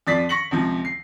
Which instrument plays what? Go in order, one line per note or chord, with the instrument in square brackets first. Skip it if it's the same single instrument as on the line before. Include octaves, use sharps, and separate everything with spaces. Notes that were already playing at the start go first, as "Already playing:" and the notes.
[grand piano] F2 F3 D5 A6 B6 C7
C#6 A#6 C#7 F#7
C#2 C3 F3
C7